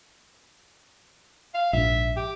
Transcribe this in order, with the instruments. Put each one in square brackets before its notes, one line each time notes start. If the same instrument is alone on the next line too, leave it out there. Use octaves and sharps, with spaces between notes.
[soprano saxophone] F5
[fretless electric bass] A#1 G#2 [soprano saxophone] E5
[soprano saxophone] G4